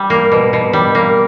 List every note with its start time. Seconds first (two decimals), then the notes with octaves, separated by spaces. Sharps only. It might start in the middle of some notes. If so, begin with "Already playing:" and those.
Already playing: G3
0.10 A#3
0.32 B2
0.53 B2
0.73 G3
0.95 A#3